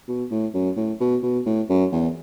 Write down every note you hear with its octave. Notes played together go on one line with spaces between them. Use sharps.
B2
A2
F#2
A2
B2
B2
A2
F#2
E2